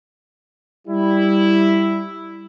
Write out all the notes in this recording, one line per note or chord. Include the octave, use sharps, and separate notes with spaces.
G3 E4